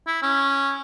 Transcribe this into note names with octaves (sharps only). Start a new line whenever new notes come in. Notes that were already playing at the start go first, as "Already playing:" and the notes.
E4
C#4